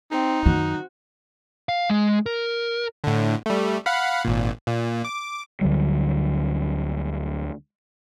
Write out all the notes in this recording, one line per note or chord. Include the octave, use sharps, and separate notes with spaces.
C4 D#4
F#2 D#3 F#4
F5
G#3
A#4
A2 D3
G3 A3
F5 F#5 B5
G#1 A#2
A#2
D6
D2 D3 F#3 G3